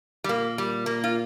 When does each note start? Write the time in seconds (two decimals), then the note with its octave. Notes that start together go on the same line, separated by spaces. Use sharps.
0.24 G3
0.29 A#2 A#3
0.58 G3
0.86 A#3
1.04 F4